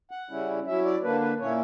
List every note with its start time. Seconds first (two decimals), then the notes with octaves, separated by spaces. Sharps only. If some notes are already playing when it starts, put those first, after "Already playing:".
0.11 F#5
0.30 C#3 G3 C#4 E4
0.66 F#3 C#4 E4 E5
0.85 D5
1.03 D3 A#3 D4 B4
1.21 B4
1.40 A#2 A#3 C#4 E4 C#5